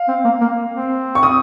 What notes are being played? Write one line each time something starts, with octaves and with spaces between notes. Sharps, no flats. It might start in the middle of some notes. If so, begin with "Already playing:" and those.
Already playing: F5
C4
A#3
A#3
C4
C#6
D#6